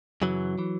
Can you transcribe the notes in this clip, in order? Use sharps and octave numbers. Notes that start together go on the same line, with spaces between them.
F#2 C#3 E3 F#3
E3